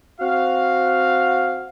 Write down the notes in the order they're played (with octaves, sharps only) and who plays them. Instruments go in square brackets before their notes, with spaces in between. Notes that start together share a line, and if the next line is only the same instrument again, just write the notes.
[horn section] C4 F#4 F5